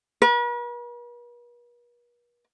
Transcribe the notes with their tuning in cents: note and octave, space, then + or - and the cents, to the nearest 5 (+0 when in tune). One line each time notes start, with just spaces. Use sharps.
B4 -45